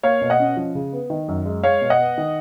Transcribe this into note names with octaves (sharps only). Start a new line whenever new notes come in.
A#3 C#5 F5
B2
D#5 F#5
C#4
F3
C#3
B3
D#3
F#2
G#3
G#3 C#5 F5
B2
D#5 F#5
B3
D#3